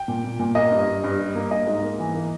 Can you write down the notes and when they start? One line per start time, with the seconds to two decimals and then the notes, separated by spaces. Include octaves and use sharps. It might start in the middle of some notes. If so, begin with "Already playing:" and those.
Already playing: G5
0.08 A#2
0.25 A#2
0.40 A#2
0.55 A#3 D#5
0.71 G2
0.87 G2
1.04 G2
1.19 G3
1.35 A#3
1.51 A#3 D#5
1.67 G#2
1.83 A#3
1.99 E3
2.15 A#3